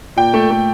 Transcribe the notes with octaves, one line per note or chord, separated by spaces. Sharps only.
A#2 G5
A3
A3